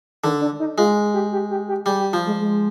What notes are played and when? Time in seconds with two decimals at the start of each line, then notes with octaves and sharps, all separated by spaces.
0.24 D3 D#3
0.41 D4
0.60 D#4
0.78 G#3 F4
1.14 G4
1.32 G4
1.50 G4
1.68 G4
1.86 G3 G#4
2.00 G4
2.13 F3 F4
2.27 G#3
2.40 G#3